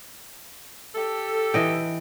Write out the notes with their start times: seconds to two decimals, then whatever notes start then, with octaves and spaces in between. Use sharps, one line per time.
0.95 G4 A4
1.54 E3 D#5 G5